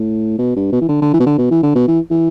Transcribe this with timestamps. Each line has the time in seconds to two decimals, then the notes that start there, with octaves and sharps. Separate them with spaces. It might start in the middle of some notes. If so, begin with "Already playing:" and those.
Already playing: A2
0.38 B2
0.56 G2
0.72 B2
0.81 E3
0.89 D3
1.01 D3
1.13 E3
1.20 B2
1.26 D3
1.38 B2
1.51 E3
1.62 D3
1.75 B2
1.88 E3
2.10 E3